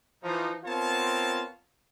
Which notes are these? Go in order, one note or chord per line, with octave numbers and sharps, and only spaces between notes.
E3 F3 D#4
B3 C4 F4 A#4 C#5 A5